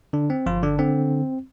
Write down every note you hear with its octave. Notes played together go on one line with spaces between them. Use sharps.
D3 D4
C4
G1 F3 F4
D3 D4
D3 C4